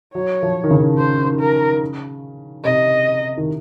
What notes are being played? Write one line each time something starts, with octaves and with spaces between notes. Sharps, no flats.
F#3 C#5
F3
D#3
C#3
C5
A#4
C3 D#5
D#3